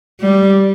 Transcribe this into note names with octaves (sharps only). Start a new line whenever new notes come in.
G3